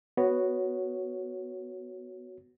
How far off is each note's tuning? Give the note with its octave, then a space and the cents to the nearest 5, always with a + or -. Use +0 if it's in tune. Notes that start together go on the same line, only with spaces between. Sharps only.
B3 +0 F#4 +0 C#5 +0